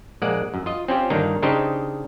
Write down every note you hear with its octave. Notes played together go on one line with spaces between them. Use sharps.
A#1 G#3 A#3 D5 F#5
F#2
F4 D#5
C4 C#4 F4 G4
G1 D#3 A#3 D4 D#4 A#5
C#3 D4 D#4 G4 C5 D#5